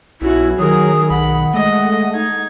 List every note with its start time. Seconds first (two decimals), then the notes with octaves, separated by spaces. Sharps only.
0.22 B1 C#4 E4 F#4
0.59 D#3 F#3 G#4 A#4 D#6
1.10 B1 F#5 B5
1.54 G#3 A3 D#5
2.14 D#4 G#6